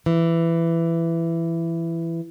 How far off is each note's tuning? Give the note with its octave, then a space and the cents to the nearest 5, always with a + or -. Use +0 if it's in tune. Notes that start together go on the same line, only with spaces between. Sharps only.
E3 +15